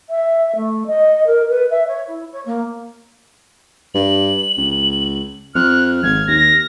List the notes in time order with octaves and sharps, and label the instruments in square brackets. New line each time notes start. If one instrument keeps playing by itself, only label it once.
[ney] E5
A3
D#5
A#4
B4
E5
C#5
E4
C#5
A#3
[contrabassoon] G2 [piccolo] F#7
[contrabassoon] C#2
[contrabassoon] F2 [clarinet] F6 [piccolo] F#6
[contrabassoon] G#1 [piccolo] G#6
[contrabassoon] D#2 [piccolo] A#6